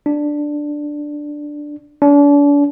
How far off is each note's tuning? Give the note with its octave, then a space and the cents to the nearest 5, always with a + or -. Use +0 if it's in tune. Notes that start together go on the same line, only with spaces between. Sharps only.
D4 +5
D4 -40